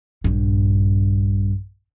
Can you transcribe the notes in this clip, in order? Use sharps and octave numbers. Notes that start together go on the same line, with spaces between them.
A#1 G2